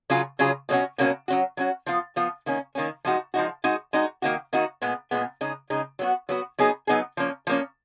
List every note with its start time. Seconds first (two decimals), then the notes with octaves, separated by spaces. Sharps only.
0.10 C#3 F#3 C#4 F4 G#4
0.39 C#3 F#3 C#4 F4 G#4
0.69 B2 F#3 A#3 C#4 F#4
0.98 B2 F#3 A#3 C#4 F#4
1.28 F#3 C#4 F#4
1.57 F#3 C#4 F#4
1.86 F3 B3 F4
2.16 F3 B3 F4
2.46 D#3 A#3 C#4
2.75 D#3 A#3 C#4
3.05 F3 G#3 D#4 F#4
3.34 F3 G#3 D#4 F#4
3.64 G#3 D#4 F#4
3.93 G#3 D#4 F#4
4.22 D#3 A#3 D#4 F#4
4.53 D#3 A#3 D#4 F#4
4.82 A#2 G#3 B3
5.11 A#2 G#3 B3
5.41 C#3 G#3 D#4
5.70 C#3 G#3 D#4
5.99 F#3 B3 F#4
6.29 F#3 B3 F#4
6.59 F#3 B3 D#4 G#4
6.87 F#3 B3 D#4 G#4
7.17 F3 A#3 C#4
7.47 F3 A#3 C#4